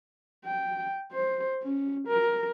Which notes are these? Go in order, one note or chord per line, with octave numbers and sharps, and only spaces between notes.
G5
C5
C#4
A#4